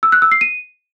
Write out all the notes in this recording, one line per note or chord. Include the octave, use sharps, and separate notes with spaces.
E6
F#6
E6
C7
D#7